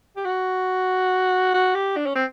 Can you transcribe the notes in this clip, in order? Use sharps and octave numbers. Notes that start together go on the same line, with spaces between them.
G4
F#4
F#4
G4
D4
C#4
C4